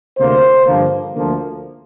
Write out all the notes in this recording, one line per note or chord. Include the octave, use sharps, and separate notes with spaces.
D2 C3 A#3 C5
G2 D3 F3 A#3
D2 D3 F3 A#3